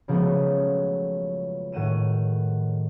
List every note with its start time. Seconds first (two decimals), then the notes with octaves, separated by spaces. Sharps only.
0.08 C#3 F3 F#3 G#3 A3 B3
1.72 A2 D#3 F#5 D#7 E7